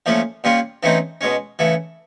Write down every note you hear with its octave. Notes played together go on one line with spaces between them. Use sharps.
A#2 F3 A3 C#4 F4
A#2 G3 A#3 C#4 F4
C#3 E3 A3 C4 D#4
B2 G#3 C#4
C#3 E3 A3